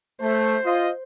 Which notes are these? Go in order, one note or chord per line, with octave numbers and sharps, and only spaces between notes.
A3 C5
F4 D#5